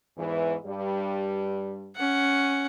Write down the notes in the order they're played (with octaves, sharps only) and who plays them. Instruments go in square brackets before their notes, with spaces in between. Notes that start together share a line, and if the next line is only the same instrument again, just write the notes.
[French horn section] E2 G#2 E3
G2 G3
[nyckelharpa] C#4 F#5